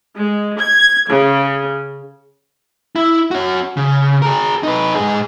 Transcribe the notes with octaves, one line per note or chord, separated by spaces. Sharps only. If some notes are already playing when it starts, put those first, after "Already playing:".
G#3
G#6
C#3
E4
C#4 F#4
C#3
G#4 A#4
D#4 B4
G#2 G#4